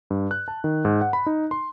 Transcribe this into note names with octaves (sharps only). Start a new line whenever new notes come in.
G2
F#6
A5
D#3
G#2
F#5
B5
D#4
C6